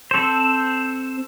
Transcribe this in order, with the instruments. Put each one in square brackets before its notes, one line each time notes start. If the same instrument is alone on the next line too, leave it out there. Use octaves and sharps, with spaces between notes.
[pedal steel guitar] C4 A4 C5